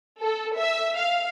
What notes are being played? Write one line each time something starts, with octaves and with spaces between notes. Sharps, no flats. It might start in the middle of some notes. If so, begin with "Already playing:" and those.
A4
E5
F5